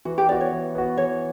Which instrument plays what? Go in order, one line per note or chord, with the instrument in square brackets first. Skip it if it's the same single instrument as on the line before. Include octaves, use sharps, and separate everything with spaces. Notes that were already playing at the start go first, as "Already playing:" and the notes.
[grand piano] E3 [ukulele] F#4
[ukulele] G4
[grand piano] B3 F#4 [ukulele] D5
[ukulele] C#5
[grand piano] E3
B3 F#4
[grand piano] E3 [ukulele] C#5